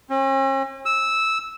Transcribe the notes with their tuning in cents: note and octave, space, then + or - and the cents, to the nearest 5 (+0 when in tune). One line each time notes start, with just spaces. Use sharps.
C#4 -45
E6 -10